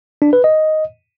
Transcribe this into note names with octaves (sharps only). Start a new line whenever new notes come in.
D4
B4
D#5